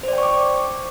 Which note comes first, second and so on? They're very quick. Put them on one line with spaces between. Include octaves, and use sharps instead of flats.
C5 D5 G5 C#6 D6